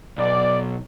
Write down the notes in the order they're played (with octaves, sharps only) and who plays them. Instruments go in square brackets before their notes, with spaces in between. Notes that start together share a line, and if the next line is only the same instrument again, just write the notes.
[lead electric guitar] B1 [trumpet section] D5